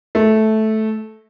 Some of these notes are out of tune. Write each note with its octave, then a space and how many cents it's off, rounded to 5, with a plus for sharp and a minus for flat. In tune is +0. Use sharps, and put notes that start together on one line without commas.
A3 -10